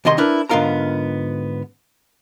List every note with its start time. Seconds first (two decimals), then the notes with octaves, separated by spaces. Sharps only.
0.05 C2 C3 D#3 D#5 C6
0.18 D4 E4 A#4 B4
0.49 G#2 D3 B3 F4 A#4 A#5